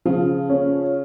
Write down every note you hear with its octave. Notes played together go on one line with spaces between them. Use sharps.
C#3 F3
C#4